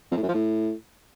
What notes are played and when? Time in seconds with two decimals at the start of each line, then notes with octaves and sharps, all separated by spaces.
0.11 F2
0.17 A2
0.23 F#2
0.28 F3
0.34 A2